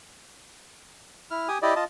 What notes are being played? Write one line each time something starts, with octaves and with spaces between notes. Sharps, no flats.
E4 F6
G4 G#5 D#6
E4 G4 D5 D#5
F4 D#5 A5